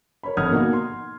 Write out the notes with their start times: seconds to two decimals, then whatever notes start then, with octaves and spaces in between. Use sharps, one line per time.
0.23 A#4 C#5 B5
0.37 G#1 D3 F#5 D#6 F6 G#6
0.51 B2 A#3 D#4 F#4
0.73 C6